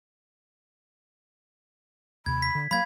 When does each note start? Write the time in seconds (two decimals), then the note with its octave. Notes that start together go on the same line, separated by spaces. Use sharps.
2.26 D#2 C3 B5 G#6
2.42 B6
2.55 D3
2.71 F#3 A#3 F5 B5 G#6